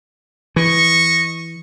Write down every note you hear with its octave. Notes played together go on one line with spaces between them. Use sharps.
E3 D#5 C#6